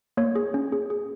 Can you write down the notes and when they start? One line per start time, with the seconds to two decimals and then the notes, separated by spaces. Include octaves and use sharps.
0.17 A#3 C#5
0.36 G#4
0.54 C#4
0.72 G#4
0.90 G#4